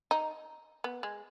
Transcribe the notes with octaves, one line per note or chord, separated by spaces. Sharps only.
D#4
B3
G#3